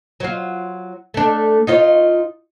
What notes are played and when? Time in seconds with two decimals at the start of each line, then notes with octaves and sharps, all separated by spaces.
0.20 F#3 F4
1.14 A3 D4
1.67 D#4 F4 C#5